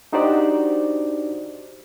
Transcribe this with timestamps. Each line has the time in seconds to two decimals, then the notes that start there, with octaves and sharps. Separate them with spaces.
0.12 D4 D#4 F#4 G4 C5 D5